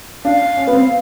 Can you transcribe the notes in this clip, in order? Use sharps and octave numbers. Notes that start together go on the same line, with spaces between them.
D4 F5
C#4
B3
C4